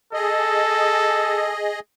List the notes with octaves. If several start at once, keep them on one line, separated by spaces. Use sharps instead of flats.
G#4 A4 D#5